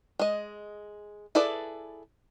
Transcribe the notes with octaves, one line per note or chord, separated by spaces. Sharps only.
G#3 D#5
E4 G#4 A4 B4 D5